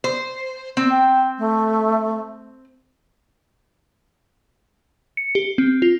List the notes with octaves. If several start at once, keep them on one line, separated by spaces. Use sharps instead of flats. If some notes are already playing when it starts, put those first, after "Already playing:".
C5
C4
G5
A3
C#7
G4
C4
F4